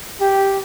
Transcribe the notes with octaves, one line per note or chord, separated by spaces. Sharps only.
G4